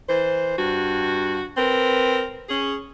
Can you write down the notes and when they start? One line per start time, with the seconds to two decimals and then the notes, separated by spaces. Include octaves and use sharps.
0.08 E3 C5
0.57 G2 F#4
1.57 C4 A#4 B4
2.49 C#4 G#4